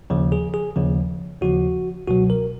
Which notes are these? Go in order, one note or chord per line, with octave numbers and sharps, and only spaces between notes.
D#2 C#3 F3
G#4
G#4
D#2 C#3 F3
D#2 C#3 F3 F#4
C#2 B2 F#3 F#4
A#4